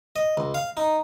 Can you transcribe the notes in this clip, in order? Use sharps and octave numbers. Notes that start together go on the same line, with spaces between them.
D#5
C#2
F5
D#4